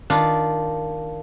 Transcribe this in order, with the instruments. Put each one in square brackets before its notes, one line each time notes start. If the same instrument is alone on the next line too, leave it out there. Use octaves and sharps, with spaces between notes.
[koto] D#3 D4 F4